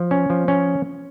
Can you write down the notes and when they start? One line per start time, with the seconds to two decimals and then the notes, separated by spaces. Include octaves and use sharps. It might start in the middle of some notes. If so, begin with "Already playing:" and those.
Already playing: F3
0.11 C#4
0.30 F3
0.48 C#4